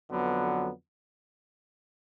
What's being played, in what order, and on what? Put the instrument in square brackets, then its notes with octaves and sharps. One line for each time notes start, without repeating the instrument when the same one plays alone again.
[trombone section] F2 D3 F#3 B3